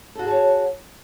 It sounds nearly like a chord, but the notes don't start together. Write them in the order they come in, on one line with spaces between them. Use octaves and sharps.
A4 F#4 G#4 A5 C#5